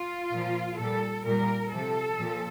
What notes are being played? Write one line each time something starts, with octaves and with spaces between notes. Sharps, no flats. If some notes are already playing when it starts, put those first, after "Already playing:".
Already playing: F4
A#2 F3
A#2 G3 A4
A#2 G3 A#4
C3 F3 A4
A#2 F3